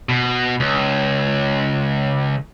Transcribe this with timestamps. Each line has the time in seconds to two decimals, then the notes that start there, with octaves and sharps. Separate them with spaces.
0.09 B2
0.60 C#2